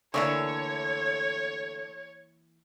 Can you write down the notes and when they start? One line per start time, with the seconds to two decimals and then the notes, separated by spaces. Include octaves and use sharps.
0.14 D3 E3 A3 A#3 D4 C#5 C#6